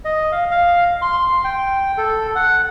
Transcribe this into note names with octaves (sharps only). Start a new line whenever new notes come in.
D#5
F5
F5
C6
G5
A4
F#5